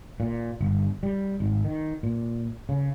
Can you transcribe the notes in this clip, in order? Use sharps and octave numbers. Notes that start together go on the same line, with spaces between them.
A#2
G1
G3
G#1
D#3
A#2
C#3